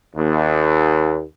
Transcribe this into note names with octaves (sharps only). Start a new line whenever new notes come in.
D#2